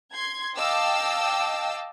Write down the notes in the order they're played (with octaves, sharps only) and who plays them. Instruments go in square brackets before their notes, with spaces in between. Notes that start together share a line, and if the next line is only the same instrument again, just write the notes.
[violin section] C6 G#6
D#5 F5 G5 A5 D6 E6